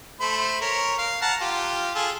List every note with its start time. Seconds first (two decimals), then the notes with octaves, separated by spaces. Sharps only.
0.21 A3 C5 B5
0.61 A#4 C#5
0.98 F5
1.22 F#5 A5 A#5
1.41 F4 G4
1.95 F4 G#4 A4